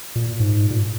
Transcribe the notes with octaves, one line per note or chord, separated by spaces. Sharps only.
A#2
G#2
A#2